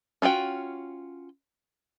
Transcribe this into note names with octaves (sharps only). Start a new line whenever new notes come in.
C#4 F4 F#4 G5